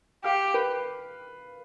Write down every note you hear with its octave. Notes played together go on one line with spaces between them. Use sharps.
G4 F5
B4